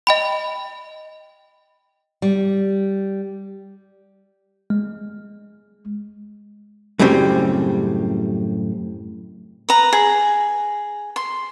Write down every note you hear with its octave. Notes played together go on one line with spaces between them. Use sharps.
D#5 G5 B5
G3
G#3
F#2 A2 C#3 G3 C4
B4 A#5
G#4
C6